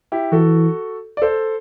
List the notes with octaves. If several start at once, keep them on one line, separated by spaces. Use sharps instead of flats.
E4 G4
E3 F#4 A4
D5
A4 C5